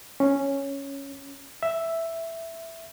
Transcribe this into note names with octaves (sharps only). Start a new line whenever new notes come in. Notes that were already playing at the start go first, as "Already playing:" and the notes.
C#4
E5